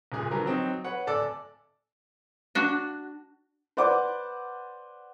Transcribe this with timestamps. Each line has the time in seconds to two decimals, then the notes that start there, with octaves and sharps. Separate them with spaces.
0.12 D#1 C#2 A#2 G#4
0.30 D3 F3 F#3 A#4 B4
0.45 F#3 C4 D#4
0.84 B4 C#5 F#5
1.07 D1 A4 D5 E6
2.55 D4 F#4
3.77 B4 C5 D5 F#5 D6